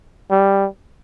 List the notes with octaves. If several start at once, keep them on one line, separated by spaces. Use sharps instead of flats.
G3